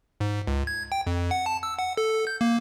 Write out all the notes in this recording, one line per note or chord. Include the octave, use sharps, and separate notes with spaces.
G#2
C#2
G#6
G5
F2
F#5
A5
E6
F#5
A4
G6
A#3